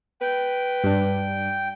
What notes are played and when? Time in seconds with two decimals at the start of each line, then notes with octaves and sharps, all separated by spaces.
0.21 B4 G5
0.84 G2 D4